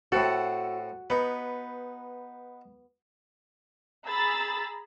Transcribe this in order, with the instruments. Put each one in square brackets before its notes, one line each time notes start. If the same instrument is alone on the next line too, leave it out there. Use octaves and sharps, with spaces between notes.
[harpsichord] A2 C4 A4 [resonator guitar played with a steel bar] F#4
[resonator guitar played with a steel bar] B3 [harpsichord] D#4 B4
[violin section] G#4 A#5 B5 E6 A6